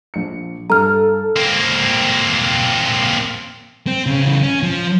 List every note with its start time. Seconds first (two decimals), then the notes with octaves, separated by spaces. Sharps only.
0.14 A#1 C#7
0.70 G2 A4 A#5 F6
1.36 A#3 C4
3.87 C4
4.06 C#3 C#4
4.21 C#3 E3
4.43 C#4
4.63 F3